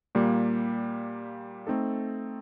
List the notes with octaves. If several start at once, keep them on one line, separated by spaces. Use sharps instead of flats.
A#2 G3 A#3
A3 C4 D#4 A4